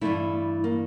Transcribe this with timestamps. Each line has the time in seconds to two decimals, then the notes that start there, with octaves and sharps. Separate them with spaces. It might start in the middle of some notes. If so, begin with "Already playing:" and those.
0.01 G2 E3 A3 E4
0.64 A#3